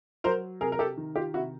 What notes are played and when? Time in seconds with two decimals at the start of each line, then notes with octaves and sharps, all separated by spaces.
0.24 F#3 A#4 C5
0.61 C3 G#4 A#4
0.72 A#4
0.79 G4 A4
0.97 D#3
1.16 F4 G4
1.34 C3 E4 F#4